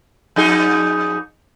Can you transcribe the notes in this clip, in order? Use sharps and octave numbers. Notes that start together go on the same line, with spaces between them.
F2 D#4 G#4